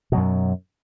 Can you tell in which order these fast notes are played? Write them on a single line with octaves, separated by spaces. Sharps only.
B2 F#3 F#2